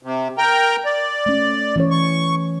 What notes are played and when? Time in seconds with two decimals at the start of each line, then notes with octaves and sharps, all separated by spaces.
0.03 C3
0.38 A#4 G5 A#5
0.85 D5
1.26 A3 C#4
1.76 E3 C#4 C#5
1.91 C#6